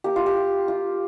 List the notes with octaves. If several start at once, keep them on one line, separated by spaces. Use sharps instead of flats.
A#3 G4
F4
G4
F4
F4